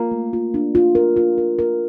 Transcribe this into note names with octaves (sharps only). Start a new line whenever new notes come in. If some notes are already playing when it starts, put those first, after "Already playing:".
Already playing: A#3 F4
A3
F4
D4
F4
A#4
F4
A#4
A#4